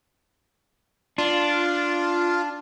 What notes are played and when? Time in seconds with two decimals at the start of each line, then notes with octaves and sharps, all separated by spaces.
1.18 D4 F4